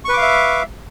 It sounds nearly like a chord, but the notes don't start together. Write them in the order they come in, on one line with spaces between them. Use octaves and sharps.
C#6 B4 D6 F5 E5